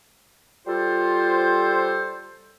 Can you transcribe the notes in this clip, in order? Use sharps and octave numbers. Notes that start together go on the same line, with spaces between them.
G3 F4 A4 C5